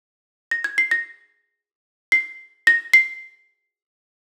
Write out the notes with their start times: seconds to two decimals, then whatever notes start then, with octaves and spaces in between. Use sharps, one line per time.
0.51 A#6
0.64 G#6
0.78 C7
0.91 A#6
2.12 C7
2.67 A#6
2.94 C7